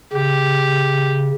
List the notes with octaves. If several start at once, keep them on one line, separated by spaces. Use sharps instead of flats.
C#3 G4